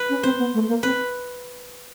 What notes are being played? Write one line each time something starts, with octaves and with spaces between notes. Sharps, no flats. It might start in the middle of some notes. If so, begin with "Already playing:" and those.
Already playing: B4
C#4
C4 C5
B3
A3
A#3
C4 B4